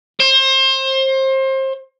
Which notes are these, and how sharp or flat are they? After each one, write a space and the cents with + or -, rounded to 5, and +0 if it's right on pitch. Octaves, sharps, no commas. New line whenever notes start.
C5 +30